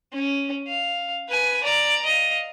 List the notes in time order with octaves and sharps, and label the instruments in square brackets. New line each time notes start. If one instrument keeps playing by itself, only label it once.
[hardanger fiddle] C#4
F5
B4 G#5
D5 A#5
D#5 F5